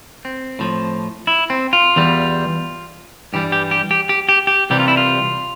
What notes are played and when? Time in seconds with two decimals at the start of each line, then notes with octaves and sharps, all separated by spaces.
0.25 C4
0.59 A2 F3
1.27 E4
1.50 C4
1.73 F4
1.96 E2 E3 G3
3.33 G2 E3 G3 G4
3.52 G4
3.71 G4
3.91 G4
4.09 G4
4.29 G4
4.47 G4
4.70 C2 C3 E3 G3 G4
4.79 F4
4.88 E4
4.97 F4